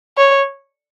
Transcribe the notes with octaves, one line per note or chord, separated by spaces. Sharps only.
C#5